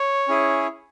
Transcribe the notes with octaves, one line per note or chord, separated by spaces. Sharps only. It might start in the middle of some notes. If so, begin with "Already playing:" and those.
Already playing: C#5
C#4 E4 G#4